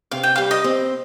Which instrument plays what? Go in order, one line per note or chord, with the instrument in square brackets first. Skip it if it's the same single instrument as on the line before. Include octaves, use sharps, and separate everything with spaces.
[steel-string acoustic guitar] C3 [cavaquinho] F5
[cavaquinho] G5
[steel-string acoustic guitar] G3 [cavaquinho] F5
[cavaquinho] D#5
[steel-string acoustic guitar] C4